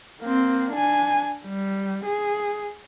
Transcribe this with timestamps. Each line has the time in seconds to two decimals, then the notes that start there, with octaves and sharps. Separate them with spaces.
0.22 A#3 C4
0.72 D4 G#5
1.46 G3
2.05 G#4